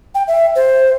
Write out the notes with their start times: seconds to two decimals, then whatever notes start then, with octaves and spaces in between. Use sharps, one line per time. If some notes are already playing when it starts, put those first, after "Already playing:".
0.15 G5
0.28 E5
0.56 C5